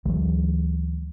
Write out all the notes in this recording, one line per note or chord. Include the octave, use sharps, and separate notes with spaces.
D2 E3 F#3 G#3